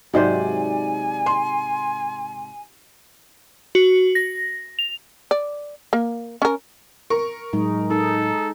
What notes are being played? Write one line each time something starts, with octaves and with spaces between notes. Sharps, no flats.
G#2 C3 F#3 D#4 C5 D5 G#5
C6
F#4
A#6
F7
D5
A#3
C#4 A#4
A#4 C#6
A2 F#3 G#3 D#4
D#4 A4